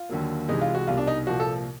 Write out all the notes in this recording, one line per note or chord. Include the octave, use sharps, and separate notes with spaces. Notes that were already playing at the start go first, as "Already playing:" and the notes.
Already playing: F4
D#2 D3 F#3 A#3
C2 C3 E3 G#3 D#4
F4
F#4
C2 B2 G3 F4
D4
D#4
C2 A#2 F3 A#3 F#4
A4